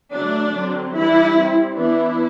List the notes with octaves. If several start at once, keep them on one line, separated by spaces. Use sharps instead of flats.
D3 F#3 A3 D4
D3 F#3 C4
E3 G3 D4 E4
G3 C4
E3 B3 D4 E4